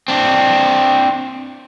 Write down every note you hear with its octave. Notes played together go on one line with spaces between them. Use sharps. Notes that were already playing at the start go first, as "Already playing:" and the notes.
C4 D4